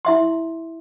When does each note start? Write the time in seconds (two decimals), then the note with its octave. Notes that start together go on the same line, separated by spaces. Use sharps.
0.05 E4 E5 C6